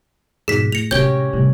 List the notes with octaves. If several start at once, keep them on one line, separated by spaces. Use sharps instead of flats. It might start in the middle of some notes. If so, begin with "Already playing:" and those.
F2 G#2 B2 G#4 B6
A2 A#6 C#7 F7
C3 G#3 C#4 G4 G6 G7
F2 A2 C3 G3